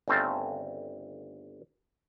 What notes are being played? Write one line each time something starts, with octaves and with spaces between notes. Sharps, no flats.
G1 C#3 A3 C4 F5 A5